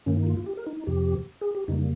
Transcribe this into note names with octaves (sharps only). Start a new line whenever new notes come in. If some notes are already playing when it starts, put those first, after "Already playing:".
G2 D#3 A#3 C#4
D#4
F4
F4
G4
A#4
D#4
D#4
F2 C3 F3 G4
G#4
G4
F2 C#3 G3 A#3 D#4